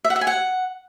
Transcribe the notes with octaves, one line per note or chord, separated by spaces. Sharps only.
E5
F#5
E5
G#5
F#5